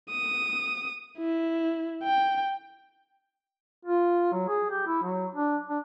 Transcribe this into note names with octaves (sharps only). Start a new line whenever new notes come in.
D#6
E4
G5
F4
F#3
G#4
G4
E4
F#3
D4
D4